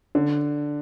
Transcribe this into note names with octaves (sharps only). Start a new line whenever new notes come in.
D3